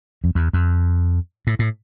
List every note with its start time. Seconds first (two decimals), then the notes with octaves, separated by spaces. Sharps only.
0.24 F2
0.35 E2
0.53 F2
1.47 A2
1.59 A2